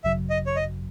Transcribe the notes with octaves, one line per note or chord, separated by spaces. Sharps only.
G#1 F#2 C#3 F#3 E5
D#5
C#5
D#5